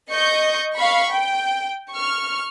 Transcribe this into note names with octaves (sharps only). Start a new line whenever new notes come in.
D#5 C#6 G6
F5 B5 C#6
G5
C#6 F6